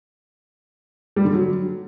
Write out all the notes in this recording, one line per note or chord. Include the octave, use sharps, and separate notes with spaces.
G3
D3
F#3